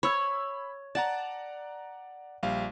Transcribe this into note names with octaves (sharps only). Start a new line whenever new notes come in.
C#5 B5 E6 G#6
D5 F#5 A5 A#5
A#1 G3 F5